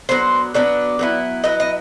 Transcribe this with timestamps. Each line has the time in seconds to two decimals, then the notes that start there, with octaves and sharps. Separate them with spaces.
0.09 F#3 B3 D4 C5
0.54 F#3 B3 D4 D5
0.99 F#3 B3 E4
1.44 F#3 B3 E4 D#5
1.60 D#5